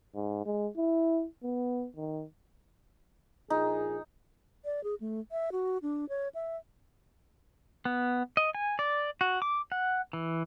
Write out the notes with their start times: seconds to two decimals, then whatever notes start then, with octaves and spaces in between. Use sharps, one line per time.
0.15 G#2
0.46 G#3
0.77 E4
1.44 B3
1.96 D#3
3.50 A#1 A#2 D#4 G#4
4.65 D5
4.84 G#4
5.00 A3
5.32 E5
5.52 F#4
5.82 D4
6.09 C#5
6.35 E5
7.85 B3
8.37 D#5
8.55 G#5
8.79 D5
9.21 F#4
9.42 D6
9.72 F#5
10.13 E3